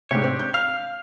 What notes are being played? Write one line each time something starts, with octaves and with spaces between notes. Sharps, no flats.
G#2 C3 D4 G4 C#5
C4
G6
F5 F6